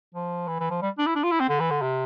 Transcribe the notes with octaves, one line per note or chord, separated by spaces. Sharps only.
F3
E3
E3
F3
G3
D4
E4
D4
F4
E4
C4
D3
E3
D3
C3